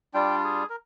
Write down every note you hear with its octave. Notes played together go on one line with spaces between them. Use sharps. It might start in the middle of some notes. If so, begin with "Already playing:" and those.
G3 D4 F4 G5
G#4
A#4